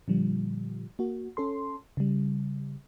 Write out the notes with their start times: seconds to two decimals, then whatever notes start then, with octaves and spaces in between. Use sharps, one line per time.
0.08 A#2 D3 F3 G3
0.99 A#3 F#4
1.37 C#4 A4 C6
1.97 C#3 G3